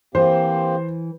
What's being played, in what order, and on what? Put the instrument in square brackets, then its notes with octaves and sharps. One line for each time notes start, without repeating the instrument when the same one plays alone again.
[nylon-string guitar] E3 [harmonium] A#3 C4 G4 [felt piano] C5